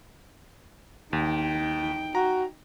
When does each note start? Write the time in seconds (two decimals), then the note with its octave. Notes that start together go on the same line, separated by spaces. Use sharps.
1.13 D#2 D#4 G5
2.15 F#4 A#5